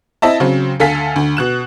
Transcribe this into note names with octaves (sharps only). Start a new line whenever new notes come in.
C4 E4 D#5 E5 A5
C#3 F#3 C4
D2 A4 F5 G#5 B6
D2
B2 F#6 E7